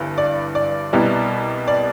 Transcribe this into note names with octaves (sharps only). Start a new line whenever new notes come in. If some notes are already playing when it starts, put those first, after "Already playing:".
Already playing: G1 G2 E3
D5
D5
C2 B2 G3 B3 E4
D5